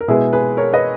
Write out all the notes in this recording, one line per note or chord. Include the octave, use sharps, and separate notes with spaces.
A#4
B2 G#3 B3 E4 G#4
G#4 B4
A#4 C#5
B4 D#5